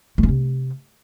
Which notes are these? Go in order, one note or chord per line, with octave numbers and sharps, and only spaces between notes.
A3
C#4
C3